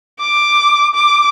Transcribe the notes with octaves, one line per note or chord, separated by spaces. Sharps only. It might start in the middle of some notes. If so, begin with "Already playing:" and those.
D6
D6